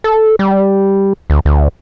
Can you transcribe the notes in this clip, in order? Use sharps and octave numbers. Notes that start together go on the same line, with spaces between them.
A4
G3
D2
D2